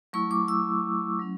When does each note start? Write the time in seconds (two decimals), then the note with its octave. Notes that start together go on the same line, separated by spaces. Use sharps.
0.13 F#3 A3 E4 C#6
0.31 D6
0.48 E6
1.19 F#3 C#4